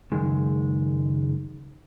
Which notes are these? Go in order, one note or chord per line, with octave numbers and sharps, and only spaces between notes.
C#2 F#2 D#3 G#3